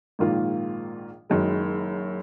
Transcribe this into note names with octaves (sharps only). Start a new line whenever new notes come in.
A#1 G#2 D#3 A#3 F4
F#1 F#2 D#3 G#3